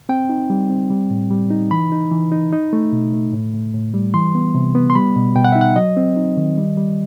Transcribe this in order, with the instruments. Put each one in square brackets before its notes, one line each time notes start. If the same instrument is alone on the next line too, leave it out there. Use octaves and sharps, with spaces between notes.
[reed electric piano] C4 G5
D#4
G3
C4
G3
A2
G3
D#4
E3 B5
D#4
E3
D#4
D#4
A3
B2
A3
A2
A2
A2
G3
E3 C6
B3
C3
B3
C6
G3 B5
B2
B2 G5
F#5
D#4 E5
F#5
F#3 D#5
C4
D#4
D#3
G3
G3